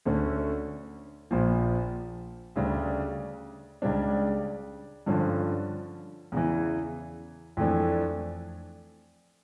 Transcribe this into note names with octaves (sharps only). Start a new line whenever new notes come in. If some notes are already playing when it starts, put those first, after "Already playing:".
D2 D3 A3 C#4
A#1 A#2 F3
D2 C#3 G3 D4
C#2 C#3 G3 D4
G2 D3 F3 C#4
E2 C#3 E3
F2 E3 A3 D4